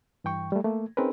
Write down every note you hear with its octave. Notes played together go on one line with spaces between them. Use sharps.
G2 E3 G5 C#6
G3 A3
A3 A#3
C4 C#4 D#4 G#4 A#4 B4